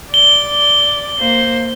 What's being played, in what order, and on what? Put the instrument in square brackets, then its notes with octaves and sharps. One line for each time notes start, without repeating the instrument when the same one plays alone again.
[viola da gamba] D5 [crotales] G7
[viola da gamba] A#3 C5